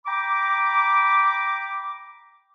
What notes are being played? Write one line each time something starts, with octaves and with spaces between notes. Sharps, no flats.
G5 A#5 B5 D6